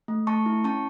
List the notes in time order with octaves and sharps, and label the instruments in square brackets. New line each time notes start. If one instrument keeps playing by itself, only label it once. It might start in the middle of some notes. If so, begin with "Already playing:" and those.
[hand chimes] A3
A3 A5 C#6
E4
C#4 A5 C#6